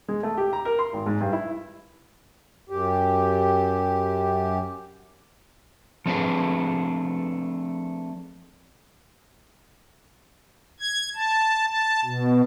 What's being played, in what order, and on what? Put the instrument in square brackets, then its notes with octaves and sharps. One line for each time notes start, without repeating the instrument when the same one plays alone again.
[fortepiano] G#3
A3
G4
A#5
A#4
C6
G#1
G#2
G2
E4
[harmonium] F#2 G4
[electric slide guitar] F3 A3 C4 D4 G#4 B4
[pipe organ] G#6
A5
A5
B2